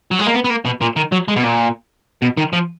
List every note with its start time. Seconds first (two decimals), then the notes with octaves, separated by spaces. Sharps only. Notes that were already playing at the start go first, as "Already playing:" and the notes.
0.11 F#3
0.19 G#3
0.27 A#3
0.34 B3
0.44 B3
0.50 A#3
0.65 B2
0.81 A#2
0.96 D#3
1.12 F#3
1.28 G#3
1.36 B2
1.44 A#2
2.22 B2
2.37 D#3
2.53 F3